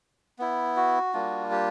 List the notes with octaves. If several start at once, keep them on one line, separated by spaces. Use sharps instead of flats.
B3 E4
F#4
G3 A#3 D4 F4
G4